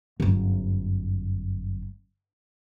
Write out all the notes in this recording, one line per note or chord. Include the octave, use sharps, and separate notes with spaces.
G1 F#2